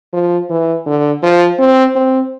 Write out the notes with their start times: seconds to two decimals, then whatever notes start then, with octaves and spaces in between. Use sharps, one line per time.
0.13 F3
0.50 E3
0.86 D3
1.23 F3
1.59 C4
1.96 C4